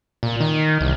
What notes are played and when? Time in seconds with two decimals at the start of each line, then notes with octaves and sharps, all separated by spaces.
0.23 A#2
0.40 D#3
0.81 C2